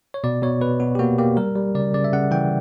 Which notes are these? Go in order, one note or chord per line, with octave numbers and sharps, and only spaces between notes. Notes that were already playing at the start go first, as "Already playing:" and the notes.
C#5
B2 D5
B2 C#5
B2 B4
B2 F#4
G4
A#3 F#4
A#3 G4
G3 A#4
G3
C#3 D5
C#3 D5
E5
C#3 F#5
E3 G5